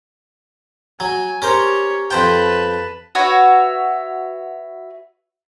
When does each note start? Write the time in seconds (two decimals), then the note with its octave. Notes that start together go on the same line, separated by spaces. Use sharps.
1.00 F#3 G#5
1.42 C#4 G4 A#4 C5 C#5
2.11 F2 B4 C5 G5 A5
3.15 F#4 B4 C#5 E5